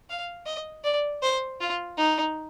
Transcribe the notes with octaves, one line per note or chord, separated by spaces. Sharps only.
F5
D#5
D5
C5
F4
D#4